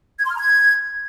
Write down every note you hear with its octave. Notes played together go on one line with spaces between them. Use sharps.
G#6
C6
F6
A#5
G#6